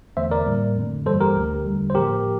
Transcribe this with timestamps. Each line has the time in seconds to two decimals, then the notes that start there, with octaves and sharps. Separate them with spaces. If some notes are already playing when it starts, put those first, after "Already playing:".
0.17 E2 D3 A3 C5 E5
0.31 A#4 D5
0.46 A2 G3 A#3
0.76 F2 D3 A3
1.06 G2 E3 G3 A#3 A4 C5
1.20 G4 A#4
1.36 D2 D3 A3
1.66 E2 D3 G3
1.90 C5
1.95 A2 F3 A#3 G4 A#4